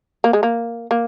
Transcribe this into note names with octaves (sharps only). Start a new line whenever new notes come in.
A#3
G#3
A#3
A#3